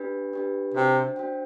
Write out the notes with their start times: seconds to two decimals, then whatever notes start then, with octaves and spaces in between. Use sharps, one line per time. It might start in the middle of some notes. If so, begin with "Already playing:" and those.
Already playing: D4 G4 B4
0.33 D4 G4 B4
0.74 C3 D4 F#4 C5 G5
1.16 D4 F#4 C5 G5